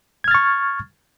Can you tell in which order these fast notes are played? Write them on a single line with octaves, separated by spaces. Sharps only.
G#6 F6 A6 C#6